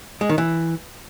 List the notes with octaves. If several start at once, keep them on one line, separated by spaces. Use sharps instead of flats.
G#3
D#3
E3